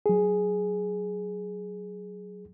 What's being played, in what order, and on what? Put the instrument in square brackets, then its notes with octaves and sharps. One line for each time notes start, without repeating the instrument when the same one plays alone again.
[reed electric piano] F#3 G#4